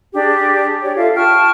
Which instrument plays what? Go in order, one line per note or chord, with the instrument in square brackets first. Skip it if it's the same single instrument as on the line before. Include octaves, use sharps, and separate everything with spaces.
[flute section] D4 G4 G#4
G4 C#5 D5
F4 A4 E5 F5
G5 A5 C#6 F6